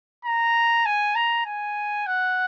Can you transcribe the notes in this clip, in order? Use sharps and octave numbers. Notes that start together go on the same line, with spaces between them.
A#5
G#5
A#5
G#5
F#5